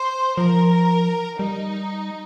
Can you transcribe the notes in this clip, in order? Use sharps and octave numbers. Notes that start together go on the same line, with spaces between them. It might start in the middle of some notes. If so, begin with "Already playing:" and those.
Already playing: C5
F3 A#4
G3 D#4